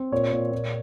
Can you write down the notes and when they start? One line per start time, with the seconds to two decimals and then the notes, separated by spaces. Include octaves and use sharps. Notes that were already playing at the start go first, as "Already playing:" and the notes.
Already playing: C4
0.12 A#2 C#5
0.32 A#2
0.52 A#2